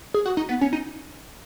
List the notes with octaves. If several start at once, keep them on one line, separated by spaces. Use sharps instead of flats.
G#4
F#4
D#4
B3
C#4
D#4